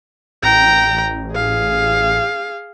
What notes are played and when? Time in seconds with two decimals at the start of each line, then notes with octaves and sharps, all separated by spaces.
0.43 A1 G5 A#5
1.32 G#4 F5